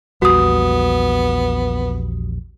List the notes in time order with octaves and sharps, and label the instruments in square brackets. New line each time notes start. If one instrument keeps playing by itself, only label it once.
[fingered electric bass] A#1 E2 G3 [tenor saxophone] B3 [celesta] F#4 D#6